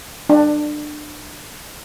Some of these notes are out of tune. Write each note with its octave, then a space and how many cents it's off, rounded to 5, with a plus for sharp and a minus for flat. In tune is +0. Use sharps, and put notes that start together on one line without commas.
D4 +25